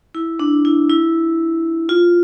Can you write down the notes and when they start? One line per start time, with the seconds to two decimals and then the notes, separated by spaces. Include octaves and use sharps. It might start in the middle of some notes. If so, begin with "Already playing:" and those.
0.15 E4
0.40 D4
0.65 E4
0.89 E4
1.89 F4